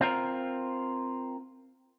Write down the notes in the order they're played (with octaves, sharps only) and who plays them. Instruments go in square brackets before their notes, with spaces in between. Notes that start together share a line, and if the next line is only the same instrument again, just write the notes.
[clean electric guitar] C4 F4 A#4